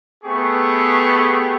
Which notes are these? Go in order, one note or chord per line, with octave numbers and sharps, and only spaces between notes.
A3 B3 G4 G#4 C#6